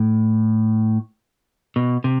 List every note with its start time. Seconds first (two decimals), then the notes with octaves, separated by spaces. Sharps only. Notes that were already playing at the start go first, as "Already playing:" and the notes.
Already playing: A2
1.76 B2
2.04 C3